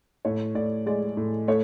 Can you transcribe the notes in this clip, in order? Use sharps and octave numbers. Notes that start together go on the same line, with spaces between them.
A2 C#5
A2 D5
G#3 D5
A2
A3 C#5